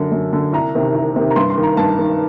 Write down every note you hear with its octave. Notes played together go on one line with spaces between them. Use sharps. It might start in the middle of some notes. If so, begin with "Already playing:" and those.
Already playing: F#2 D3
F#2
D3
C2 A#5
C3 D#3
C2
C3 D#3
A#5
G2 C6
C6
D#3
A#5
G2 A5
D#3